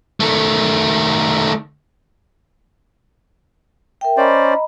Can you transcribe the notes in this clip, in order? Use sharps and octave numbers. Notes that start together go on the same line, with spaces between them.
D#3 A3
A#4 E5 G5
C#4 C5 D5 D#5 A#5 B5